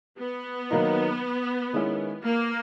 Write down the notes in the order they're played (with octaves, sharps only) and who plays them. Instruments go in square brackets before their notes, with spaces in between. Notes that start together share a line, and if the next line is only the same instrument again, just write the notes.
[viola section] B3
[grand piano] D#3 F#3 A#3 D#4
D#3 G#3 C#4 E4
[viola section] A#3